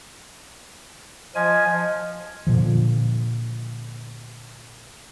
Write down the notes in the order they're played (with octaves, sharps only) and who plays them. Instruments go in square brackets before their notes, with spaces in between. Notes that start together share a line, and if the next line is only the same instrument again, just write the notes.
[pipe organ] F3 G#5 [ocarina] D#5
[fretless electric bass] A#2 D3 F3